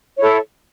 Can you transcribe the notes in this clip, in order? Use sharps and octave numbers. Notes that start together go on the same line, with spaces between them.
E4 A4 C#5